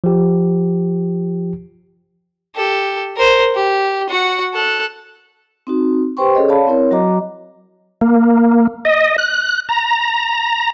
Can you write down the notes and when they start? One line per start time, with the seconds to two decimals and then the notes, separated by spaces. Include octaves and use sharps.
0.04 F3 G4
2.55 G4 A4
3.17 A#4 C5
3.55 G4
4.10 F#4 F#5
4.53 A4 F#6
5.67 C4 D#4 F#4
6.17 G4 B4 C5 G5 C6 C#6
6.35 C#4 G#4 A4 C#5 D#5
6.48 C#5 D5 F5 A5 B5
6.67 C4 E4 A#4 C#5
6.91 F#3 F#4 D#5 A#5 D6
8.01 A#3
8.85 D#5
9.18 F#6
9.69 A#5